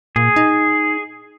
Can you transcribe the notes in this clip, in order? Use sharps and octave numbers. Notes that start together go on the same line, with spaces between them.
A#2 G#4
D#4